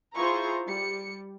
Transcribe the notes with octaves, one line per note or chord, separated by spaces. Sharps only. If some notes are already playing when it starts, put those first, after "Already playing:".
E4 F4 G#4 C5 A#5 C#6
G3 C#7